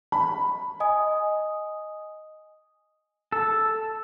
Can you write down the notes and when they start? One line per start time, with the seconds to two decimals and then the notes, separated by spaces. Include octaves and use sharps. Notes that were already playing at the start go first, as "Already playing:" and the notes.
0.12 B5
0.80 D#5 G#5 D#6
3.32 A4